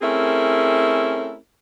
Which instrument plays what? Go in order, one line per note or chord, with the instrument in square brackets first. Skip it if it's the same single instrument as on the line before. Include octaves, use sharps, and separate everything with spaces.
[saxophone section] A3 C4 C#4 E4 G#4 A#4